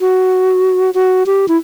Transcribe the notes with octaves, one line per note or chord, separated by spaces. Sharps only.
F#4
F#4
G4
E4